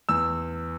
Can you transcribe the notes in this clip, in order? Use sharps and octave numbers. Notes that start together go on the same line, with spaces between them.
E2 E6